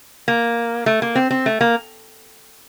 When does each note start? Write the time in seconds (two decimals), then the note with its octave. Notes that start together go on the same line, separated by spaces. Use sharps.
0.28 A#3
0.86 A3
1.02 A#3
1.15 C4
1.31 C4
1.46 A3
1.61 A#3